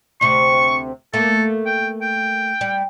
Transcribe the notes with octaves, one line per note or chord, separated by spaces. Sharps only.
D2 C3 C#6
A3 A#3 A4
G5
G5
G3